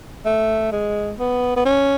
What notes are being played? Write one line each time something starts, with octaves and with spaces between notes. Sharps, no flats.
A3
G#3
B3
B3
C#4